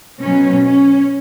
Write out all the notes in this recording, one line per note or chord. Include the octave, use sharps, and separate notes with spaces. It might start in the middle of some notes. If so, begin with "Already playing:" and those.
B2 F#3 C#4
C#4